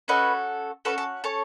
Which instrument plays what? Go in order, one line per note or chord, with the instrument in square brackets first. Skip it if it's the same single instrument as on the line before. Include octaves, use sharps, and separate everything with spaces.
[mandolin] C#4 F#4 A4 B4 D#5
C#4 F#4 A4 B4
A4
A4 C#5